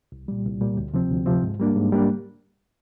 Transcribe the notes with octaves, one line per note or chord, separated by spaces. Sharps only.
C2
A#2 G3
C2
A#2 G3
D2
C3 F3 C4
D2
C3 F3 C4
G#2
G3 A#3 D4
G#2
G3 A#3 D4